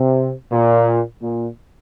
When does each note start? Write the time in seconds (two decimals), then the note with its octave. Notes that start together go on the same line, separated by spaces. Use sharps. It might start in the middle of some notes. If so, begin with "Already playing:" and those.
Already playing: C3
0.52 A#2
1.22 A#2